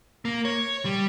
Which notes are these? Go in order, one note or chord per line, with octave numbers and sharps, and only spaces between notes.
A#3
C#5
G3